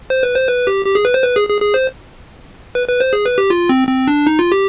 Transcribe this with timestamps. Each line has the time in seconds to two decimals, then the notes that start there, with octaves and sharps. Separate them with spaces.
0.10 C5
0.23 B4
0.35 C5
0.48 B4
0.67 G4
0.86 G4
0.95 G#4
1.05 B4
1.14 C5
1.24 B4
1.36 G#4
1.49 G#4
1.62 G#4
1.74 C5
2.75 B4
2.88 B4
3.00 C5
3.13 G#4
3.26 B4
3.38 G4
3.50 F4
3.69 C4
3.88 C4
4.08 D4
4.27 D#4
4.39 F4
4.52 G4